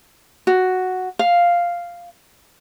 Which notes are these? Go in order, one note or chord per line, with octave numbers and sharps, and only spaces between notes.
F#4
F5